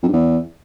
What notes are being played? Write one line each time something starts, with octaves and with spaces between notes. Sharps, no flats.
F2
G2
E2